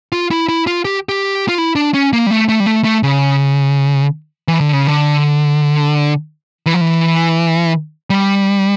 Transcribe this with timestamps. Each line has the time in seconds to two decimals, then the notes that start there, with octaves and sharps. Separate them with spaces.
0.12 F4
0.31 E4
0.49 E4
0.67 F4
0.85 G4
1.09 G4
1.49 F4
1.58 E4
1.76 D4
1.94 C#4
2.13 A#3
2.27 G3
2.30 A3
2.49 A3
2.60 G3
2.66 A3
2.84 A3
3.03 C#3
4.48 E3
4.60 D3
4.73 C#3
4.87 D3
6.66 E3
6.74 F3
6.81 E3
8.10 G3